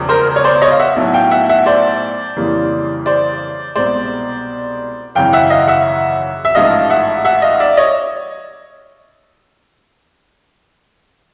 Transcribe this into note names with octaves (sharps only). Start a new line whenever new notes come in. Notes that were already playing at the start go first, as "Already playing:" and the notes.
Already playing: E1 E2 C#3 F3
A#4 C5
C#5
C5 D5
C#5 D#5
F5
E5 F#5
B1 A2 F#3 A3
F5 G5
E5 F#5
E5 F#5
C5 D5
F2 C#3 E3 G3 A#3
C5 D5
C2 B2 G#3 C5 D5
G#1 F#2 C#3 E3 F5 G5
E5 F#5
D#5 F5
E5 F#5
E5
A1 G#2 F3 A3 D#5 F5
E5 F#5
E5 F#5
D#5 F5
D5 E5
C#5 D#5